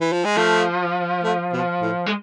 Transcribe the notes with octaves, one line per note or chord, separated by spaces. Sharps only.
E3
F3
G#3
F3 A3
A3
B2
A2
G#3